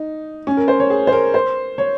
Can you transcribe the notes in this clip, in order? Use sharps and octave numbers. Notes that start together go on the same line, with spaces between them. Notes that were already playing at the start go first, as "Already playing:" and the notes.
Already playing: D#4
C#4
A#4
C5
C#5
G#4
C5
A#4
C5
C#5